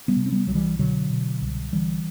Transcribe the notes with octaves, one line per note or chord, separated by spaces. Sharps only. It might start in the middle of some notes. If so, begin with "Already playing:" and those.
G3 B3
C3
C4
G3 B3
C2 F#3
E3 G3
B2 D3 F#3
B2
C2
D3 E3 G3